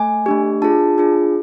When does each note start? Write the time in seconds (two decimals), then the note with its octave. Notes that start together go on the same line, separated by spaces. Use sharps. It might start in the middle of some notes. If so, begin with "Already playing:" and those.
Already playing: A3 G#5
0.26 A3 D4 G4
0.62 D4 F4 G#4 A5
0.98 D4 F4 G#4